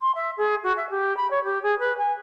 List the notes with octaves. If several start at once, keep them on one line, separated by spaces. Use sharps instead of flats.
C6
E5
G#4
F#4
E5
G4
B5
C#5
G4
G#4
B4
G#5